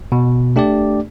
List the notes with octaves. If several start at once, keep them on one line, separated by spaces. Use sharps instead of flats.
B2
A3 D4 G4 D5